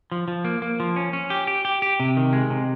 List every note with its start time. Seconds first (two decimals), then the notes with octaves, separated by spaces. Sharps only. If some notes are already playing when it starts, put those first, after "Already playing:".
0.12 F3
0.28 F3
0.45 A#3
0.62 A#3
0.80 F3
0.96 C#4
1.13 C#4
1.30 G4
1.47 G4
1.65 G4
1.82 G4
2.00 C3
2.17 D#3
2.33 G#3
2.50 C3